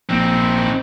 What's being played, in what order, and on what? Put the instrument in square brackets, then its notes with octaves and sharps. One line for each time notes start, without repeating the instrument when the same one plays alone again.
[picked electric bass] A#1 F3 A#3 [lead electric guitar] C4 D#4